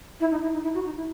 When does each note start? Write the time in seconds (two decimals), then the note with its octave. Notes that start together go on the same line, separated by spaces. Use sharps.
0.20 E4
0.31 D#4
0.42 E4
0.53 D#4
0.64 E4
0.74 F#4
0.85 D#4
0.96 E4